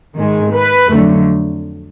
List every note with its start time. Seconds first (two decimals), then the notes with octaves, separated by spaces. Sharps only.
0.15 G#2 D#3 G#3
0.52 B4
0.89 F2 D3 F#3 A3